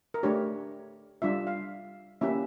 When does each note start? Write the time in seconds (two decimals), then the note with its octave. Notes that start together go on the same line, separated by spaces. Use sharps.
0.14 A#4
0.23 A3 D4 G4 C#5
1.22 G3 D4 F4 E5
1.47 F5
2.21 A#3 C#4 E4 G4 E5